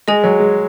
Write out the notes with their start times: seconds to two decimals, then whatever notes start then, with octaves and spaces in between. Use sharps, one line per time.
0.08 G#3 G#4 D#5 G#5
0.24 F#3
0.40 G#3